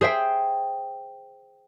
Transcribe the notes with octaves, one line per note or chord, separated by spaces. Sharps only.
G#4 C5 E5 G5